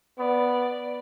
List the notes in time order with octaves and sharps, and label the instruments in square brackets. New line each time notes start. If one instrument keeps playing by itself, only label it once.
[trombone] B3 [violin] D5